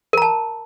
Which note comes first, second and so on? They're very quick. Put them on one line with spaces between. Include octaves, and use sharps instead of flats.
A#4 A#5 A5